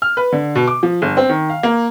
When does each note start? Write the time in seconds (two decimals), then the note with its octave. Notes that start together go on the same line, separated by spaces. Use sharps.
0.02 F6
0.17 B4
0.33 D3
0.55 B2
0.68 D6
0.83 F3
1.02 G1
1.17 C4
1.29 D#3
1.50 F5
1.63 A#3